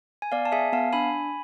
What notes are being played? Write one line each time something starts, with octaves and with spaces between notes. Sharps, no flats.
G#5
B3 D5 F5
A5
G#4 E5 G#5
B3 F5 A5
D4 G#5 B5